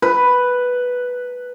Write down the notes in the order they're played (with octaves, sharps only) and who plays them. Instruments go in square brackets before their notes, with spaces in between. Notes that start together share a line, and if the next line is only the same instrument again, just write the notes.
[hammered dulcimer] B4